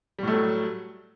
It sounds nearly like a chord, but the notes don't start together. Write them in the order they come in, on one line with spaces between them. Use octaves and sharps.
G3 A2 A3 F#3